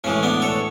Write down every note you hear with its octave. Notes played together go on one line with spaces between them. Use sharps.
A2 E3 G#3 C#4
B3 D4
A4 C#5